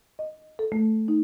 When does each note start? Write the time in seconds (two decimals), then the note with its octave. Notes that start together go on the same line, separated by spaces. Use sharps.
0.19 D#5
0.59 A4
0.72 A3
1.08 D#4